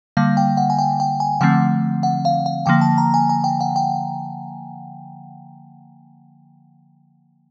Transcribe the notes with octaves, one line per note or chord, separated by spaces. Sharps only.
D3 G3 A#3 F5
G5
F#5
G#5
G5
G5
G#5
D3 F3 A3 C4 F#5
F#5
F5
F5
D3 F3 A#3 G5
A5
A#5
G#5
G#5
G5
F#5
G5